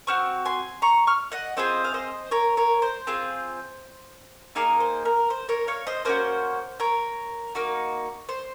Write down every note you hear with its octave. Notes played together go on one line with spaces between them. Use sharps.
C4 F#4 C#6 F6
G#5 C6
A#5 C#6
C#6 F6
D#5 F#5
C4 F4 G#4 C5 D#5
F5
C5 D#5
A#4 C#5
A#4 C#5
C5
C4 F4 G#4
A#3 D#4 G#4 A#4
C5
A#4
C5
A#4 C#5
C#5 F5
C5 D#5
A#3 C#4 F#4 C5
A#4 C#5
A#3 D#4 F#4
C5